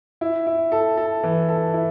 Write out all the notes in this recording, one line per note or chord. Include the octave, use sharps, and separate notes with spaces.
E4
E4
A4
A4
E3
A4
E4